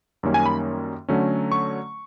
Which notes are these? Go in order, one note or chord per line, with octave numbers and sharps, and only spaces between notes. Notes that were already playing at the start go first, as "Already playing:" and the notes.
F#2 D#3 G3 A#3 C#4
G#5
B5
D3 F#3 A3 C#4
C#6